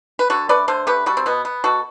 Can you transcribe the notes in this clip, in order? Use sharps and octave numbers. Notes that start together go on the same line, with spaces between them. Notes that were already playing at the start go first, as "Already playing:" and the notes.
B4
D3 F#4 A4
A3 B4 D5
D3 A4 C5
A3 G4 B4
G3 F#4 A4
C4
B2 B3
B3
B2 F#4 A4